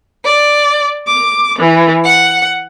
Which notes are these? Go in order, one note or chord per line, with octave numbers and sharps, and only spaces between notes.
D5
D6
E3
F#5